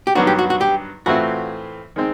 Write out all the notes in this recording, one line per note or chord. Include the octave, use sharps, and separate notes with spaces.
G4
G2 D#3 F#3 B3 D4 F#4
G4
F#4
F#4
G4
A2 E3 A3 C4 F4 F#4
D#3 G#3 C4